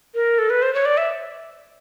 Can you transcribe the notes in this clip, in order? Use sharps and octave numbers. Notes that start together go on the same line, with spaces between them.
A#4
A4
B4
C5
C#5
D5
E5